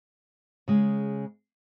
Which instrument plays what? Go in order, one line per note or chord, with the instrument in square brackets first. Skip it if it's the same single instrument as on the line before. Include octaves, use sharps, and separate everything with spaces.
[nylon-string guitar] C#3 G#3